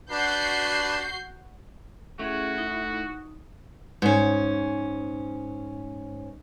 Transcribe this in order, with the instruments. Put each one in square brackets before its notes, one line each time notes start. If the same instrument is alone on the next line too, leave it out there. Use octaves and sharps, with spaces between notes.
[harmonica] D4 B4 [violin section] F#4 G6 C7
[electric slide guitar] A3 E4 [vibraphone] C#4 G#4 [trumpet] F#4
[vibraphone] D#4
[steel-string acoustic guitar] G#2 C#4